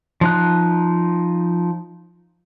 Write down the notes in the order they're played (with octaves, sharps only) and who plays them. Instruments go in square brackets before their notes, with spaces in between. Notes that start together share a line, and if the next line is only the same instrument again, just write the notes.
[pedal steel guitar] F3 D#4 F#6